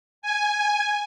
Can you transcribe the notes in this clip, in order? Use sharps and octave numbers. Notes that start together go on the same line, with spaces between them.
G#5